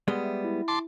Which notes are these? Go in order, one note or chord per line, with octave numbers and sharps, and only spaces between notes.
G3 G#3 B3 D5
E5
E4
A5 C6 D6